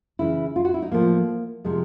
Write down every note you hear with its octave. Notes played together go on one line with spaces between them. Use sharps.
C#3 E3 E4
F4
F#4
E4
D#4
A2 F3 A#3
C3 F3 G#3